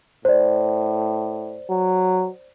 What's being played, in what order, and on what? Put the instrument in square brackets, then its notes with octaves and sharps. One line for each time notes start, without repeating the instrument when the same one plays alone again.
[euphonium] A2 [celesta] C5 D5
[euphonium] F#3